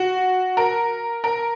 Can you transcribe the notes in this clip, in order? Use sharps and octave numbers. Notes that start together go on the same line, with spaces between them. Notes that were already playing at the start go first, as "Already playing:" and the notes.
Already playing: F#4
A#4
A#4